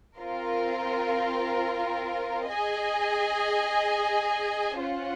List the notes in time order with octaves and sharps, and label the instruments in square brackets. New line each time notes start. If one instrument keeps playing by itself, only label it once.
[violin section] C4 F4 A#4
G#4 D#5 G#5
C#4 F4 C5 F#5